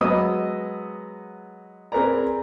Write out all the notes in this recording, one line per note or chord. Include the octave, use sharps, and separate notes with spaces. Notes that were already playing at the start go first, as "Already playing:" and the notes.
F#3 G#3 B3 D#5 D#6 E6
C4 G#4 A#4 B4 D5 A#5